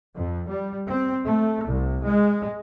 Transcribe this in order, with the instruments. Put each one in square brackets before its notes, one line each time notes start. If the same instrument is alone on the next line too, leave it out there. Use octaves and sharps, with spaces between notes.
[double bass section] F2
G3
C4
A3
C2
G#3